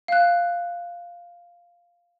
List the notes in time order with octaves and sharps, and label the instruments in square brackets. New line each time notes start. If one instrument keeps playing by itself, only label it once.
[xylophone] F5 F#6